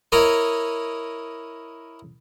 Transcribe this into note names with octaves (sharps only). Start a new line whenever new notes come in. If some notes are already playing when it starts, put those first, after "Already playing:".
E4 A#4 C#5 D#5